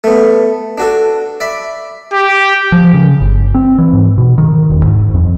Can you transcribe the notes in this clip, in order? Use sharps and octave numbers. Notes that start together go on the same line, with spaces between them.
A3 B3
D4 F#4 A4
D5 E5 B5
G4
F3
C#3
G1
C4
E3
G#2
B2
D#3
E1
G#2
F2